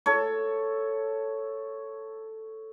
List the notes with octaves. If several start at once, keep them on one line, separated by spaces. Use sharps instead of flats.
A4 C#5